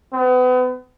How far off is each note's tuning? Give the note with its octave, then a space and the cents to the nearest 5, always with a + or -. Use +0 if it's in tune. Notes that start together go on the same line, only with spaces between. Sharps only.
B3 +35